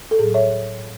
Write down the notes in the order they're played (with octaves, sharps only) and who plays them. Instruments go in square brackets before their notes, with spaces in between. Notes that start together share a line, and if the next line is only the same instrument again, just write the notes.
[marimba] A4
A2 F#3 G#4
C#5 E5